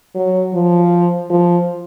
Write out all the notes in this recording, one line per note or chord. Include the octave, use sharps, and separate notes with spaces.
F#3
F3
F3